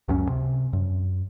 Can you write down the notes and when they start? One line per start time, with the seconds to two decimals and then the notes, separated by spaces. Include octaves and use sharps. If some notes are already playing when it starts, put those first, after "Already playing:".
0.08 C#2 F#2 F#3 C#4
0.29 C3
0.73 F#2